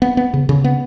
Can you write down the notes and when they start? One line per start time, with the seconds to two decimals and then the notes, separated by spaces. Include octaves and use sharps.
0.02 B3
0.17 B3
0.34 C#3
0.49 C#3
0.64 B3